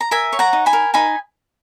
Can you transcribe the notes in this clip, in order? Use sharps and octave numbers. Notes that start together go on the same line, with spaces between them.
A#5
A#4 E5 G#5
C#5
F#5 A#5
D#4
G#5 B5
A#4
D#4 G#5 B5